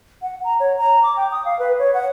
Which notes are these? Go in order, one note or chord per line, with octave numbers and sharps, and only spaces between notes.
F#5
A#5
C#5
A#5
D6
G5
D#6
F5
B4
C#5
F#5